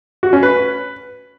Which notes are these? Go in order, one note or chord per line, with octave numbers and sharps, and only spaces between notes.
F#4
C#4
B4